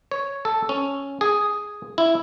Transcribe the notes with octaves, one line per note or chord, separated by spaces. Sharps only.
C#5
A4
C#4
G#4
E4